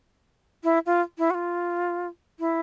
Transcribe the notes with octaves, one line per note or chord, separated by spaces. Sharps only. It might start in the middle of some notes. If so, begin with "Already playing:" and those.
E4
F4
E4
F#4
F4
E4